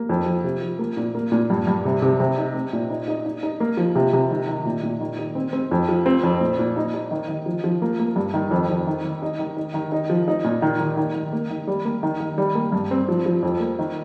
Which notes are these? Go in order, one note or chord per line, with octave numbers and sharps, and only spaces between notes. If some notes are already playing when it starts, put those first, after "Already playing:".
Already playing: A#3
F2
F3
C3
F3
A#3
A#2
A#3
A#2
G2
G2
C3
C3
C3
D#4
C4
A#2
D#4
D#4
D#4
D#4
A#3
F3
C3
C3
D#3
D#3
A#2
A#2
D#3
D#4
C4
C4
F2
F3
C4
F2
A#2
A#2
D#4
D#4
D#3
D#3
F3
F3
A#3
A#3
G2
D#3
F2
F2
D#3
D#3
D#4
D#3
D#4
D#3
D#4
F3
D#4
A#2
D#3
D#3
D#3
D#3
A#3
D#3
G3
A#3
D#3
D#3
G3
A#3
G2
C4
F3
F3
F2
A#3
D#3